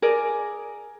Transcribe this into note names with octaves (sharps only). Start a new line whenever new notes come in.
G#4 A#4 D5